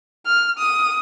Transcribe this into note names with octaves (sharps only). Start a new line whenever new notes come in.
F6
D#6